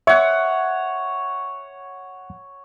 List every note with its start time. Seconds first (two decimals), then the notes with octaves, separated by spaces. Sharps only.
0.07 C#5 E5 F#5